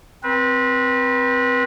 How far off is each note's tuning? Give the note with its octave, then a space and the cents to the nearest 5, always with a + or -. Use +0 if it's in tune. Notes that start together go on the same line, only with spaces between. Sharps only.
C4 +0 B4 -30